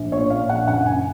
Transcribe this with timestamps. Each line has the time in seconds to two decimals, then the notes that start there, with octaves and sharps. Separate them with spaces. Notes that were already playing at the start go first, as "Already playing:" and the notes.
Already playing: A#1
0.12 A#2 C#5
0.30 A#2 F5
0.49 A#1 F#5
0.68 F#1 F#5
0.87 F#2 G#5